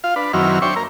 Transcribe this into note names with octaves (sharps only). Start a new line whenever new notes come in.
F4 F5
D4 B4
F#2 D#3 F#3 C4 E4 F6
D4 C5 C#5 E5 G5 C#6
A#3 A#4